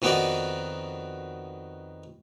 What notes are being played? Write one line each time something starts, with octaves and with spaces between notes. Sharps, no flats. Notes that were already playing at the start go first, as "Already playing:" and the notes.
F2 D#3 B3 D#4 F#4 D5